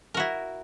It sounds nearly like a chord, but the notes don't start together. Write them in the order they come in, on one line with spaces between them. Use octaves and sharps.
A#4 F#4 E4